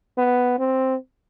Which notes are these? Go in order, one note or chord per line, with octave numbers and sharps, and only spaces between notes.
B3
C4